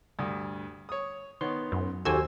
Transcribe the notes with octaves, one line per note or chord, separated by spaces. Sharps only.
D2 G2 D#6
C#5 D#6
D#3 B3 C#5 C6
F#2
D#2 F#4 G4 A4 C5 G#5 E6